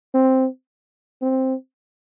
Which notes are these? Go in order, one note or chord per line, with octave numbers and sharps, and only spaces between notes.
C4
C4